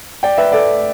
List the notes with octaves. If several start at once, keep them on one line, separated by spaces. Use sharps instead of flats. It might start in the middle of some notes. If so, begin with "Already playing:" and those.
D5 G5
B4 E5
A4 D5